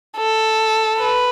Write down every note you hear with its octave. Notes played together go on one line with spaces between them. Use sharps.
A4
B4